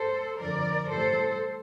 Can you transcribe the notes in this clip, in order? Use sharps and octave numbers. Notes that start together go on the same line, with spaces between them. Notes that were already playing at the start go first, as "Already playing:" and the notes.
Already playing: A4 C5
F2 D3 F3 A#4 D5
A2 E3 G3 A4 C5